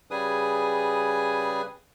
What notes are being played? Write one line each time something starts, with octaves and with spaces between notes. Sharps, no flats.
C#3 G3 G#4 B4 G#5 D#6